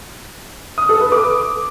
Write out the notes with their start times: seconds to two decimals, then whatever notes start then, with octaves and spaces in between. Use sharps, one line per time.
0.78 D#6
0.89 A4
1.01 B4
1.12 D6